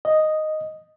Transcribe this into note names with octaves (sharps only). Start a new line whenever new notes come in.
D#5